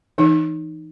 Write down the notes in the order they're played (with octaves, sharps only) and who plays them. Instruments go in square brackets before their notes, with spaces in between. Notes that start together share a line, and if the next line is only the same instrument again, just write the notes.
[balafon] E3 D#4